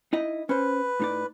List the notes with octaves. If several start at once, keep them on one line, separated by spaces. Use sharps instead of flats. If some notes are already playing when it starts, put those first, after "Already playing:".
D#4 E4 D#5
C#4 B4 C5
A2 D#4 D5